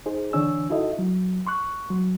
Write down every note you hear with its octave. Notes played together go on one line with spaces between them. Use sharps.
D#4 G#4 C5
D3 E3 D4 C#5 G#5 E6
D#4 E4 F#4 A4 D#5 E5
F#3
C6 C#6 F#6
F#3